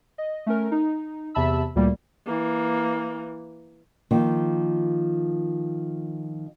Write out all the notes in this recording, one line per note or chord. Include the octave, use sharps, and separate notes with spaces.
D#5
A3 C#4 A#4
D#4
E2 C3 E5 A5 B5 E6
D2 A#2 G3 A#3
E3 A#3
D#3 F3 A#3